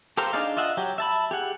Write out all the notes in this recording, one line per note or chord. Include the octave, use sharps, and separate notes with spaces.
G4 A4 A#4 C5 F5
D4 D#4 G#4 D5 F5
F4 D#5 E5 F#5
F#3 G4
E5 A5 B5
G4 G#4 F#5